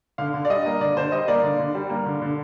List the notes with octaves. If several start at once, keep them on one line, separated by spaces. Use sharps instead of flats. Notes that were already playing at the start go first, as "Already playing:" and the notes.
D3 F5
D3
D5
G3 D#5
A#3
D3 D5
D3 C5
G3 D#5
A#3 D5
D3
D3
G3
A#3
D3
D3